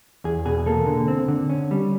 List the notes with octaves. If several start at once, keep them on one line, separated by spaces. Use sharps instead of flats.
E2 G#4
B2 G#4
A#3 A4
D3
C4
D3
C#4
G3